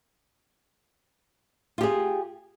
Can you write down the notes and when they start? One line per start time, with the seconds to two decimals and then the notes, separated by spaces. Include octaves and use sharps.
1.78 F4
1.81 G4
1.83 G#4